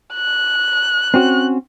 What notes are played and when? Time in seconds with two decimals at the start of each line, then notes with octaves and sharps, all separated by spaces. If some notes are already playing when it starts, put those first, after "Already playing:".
0.14 F#6
1.14 C4 C#4 F#4